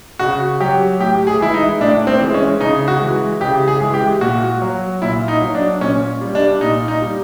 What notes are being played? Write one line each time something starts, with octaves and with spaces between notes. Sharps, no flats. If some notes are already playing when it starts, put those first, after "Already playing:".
C#3 F#4
F#3 G4
A2 G4
G#4
E3 G#3 E4
D#4
A2 D4
C4
E3 G#3
C#4
C#3 D#4
F#4
E3 G#3
C#3 G4
G#4
E3 G#3
G4
A#2 F#4
F#3
A#2 E4
D#4
F#3
D4
A#2 C#4
G3
D4
A#2 D#4
D#4
G3